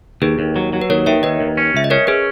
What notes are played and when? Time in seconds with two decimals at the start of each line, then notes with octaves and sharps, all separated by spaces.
0.22 D#2 G#4 B4
0.39 D#2
0.56 F#3
0.73 F#3
0.81 B4
0.90 D#2 A#4 C#5
1.06 D#3 C#5 E5
1.23 D#2 B4 D#5
1.41 D#2
1.57 C#4
1.74 C#2 E5
1.84 D#5
1.90 C#4 A#4 C#5
2.07 C#4 G#4 B4